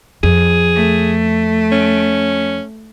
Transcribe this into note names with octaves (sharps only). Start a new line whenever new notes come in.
F2 G#4
A3
C#4